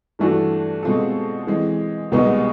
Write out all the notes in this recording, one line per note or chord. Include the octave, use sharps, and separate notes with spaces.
G2 E3 A3 D4 F#4
B2 G#3 C4 F4 A4
E3 G#3 C4
C2 B2 G#3 B3 D#4